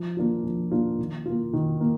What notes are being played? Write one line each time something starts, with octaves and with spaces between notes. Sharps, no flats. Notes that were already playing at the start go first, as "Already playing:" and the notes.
Already playing: F3
A#3 D4 F4
F3
A#3 D4 F4
D#3
A#3 F4
D#3
A#3